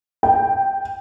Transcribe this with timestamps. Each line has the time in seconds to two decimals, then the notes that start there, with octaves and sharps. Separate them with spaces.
0.23 G5